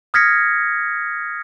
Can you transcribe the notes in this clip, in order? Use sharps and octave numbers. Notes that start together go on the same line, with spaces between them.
D#6 F6 G#6 A#6 B6 C#7